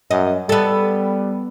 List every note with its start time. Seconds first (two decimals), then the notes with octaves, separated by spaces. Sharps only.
0.11 F#2 D#5
0.49 G3 B3 A4